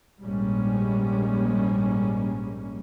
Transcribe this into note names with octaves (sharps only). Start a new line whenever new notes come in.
A#1 G#2 G3 G#3 A#3 C#4